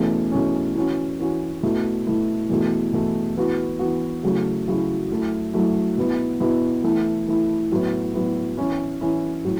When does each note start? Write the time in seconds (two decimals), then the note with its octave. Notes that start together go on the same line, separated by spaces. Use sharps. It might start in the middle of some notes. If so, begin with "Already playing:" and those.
Already playing: E2 B2 A3 C#4
0.32 E2 B2 A3 C#4
0.75 E3 C#4 F#4
1.19 E3 C#4 F#4
1.63 B2 A3 E4
2.07 B2 A3 E4
2.49 E2 B2 A3
2.93 E2 B2 A3
3.37 E3 B3 F#4
3.79 E3 B3 F#4
4.23 C#3 F#3 A3 E4
4.67 C#3 F#3 A3 E4
5.10 F#2 F#3 A3 E4
5.54 F#2 F#3 A3 E4
5.97 B2 B3 E4
6.40 B2 B3 E4
6.84 E3 A3 E4
7.27 E3 A3 E4
7.71 A2 F#3 B3 E4
8.14 A2 F#3 B3 E4
8.57 E3 C#4 E4
9.01 E3 C#4 E4
9.45 A2 F#3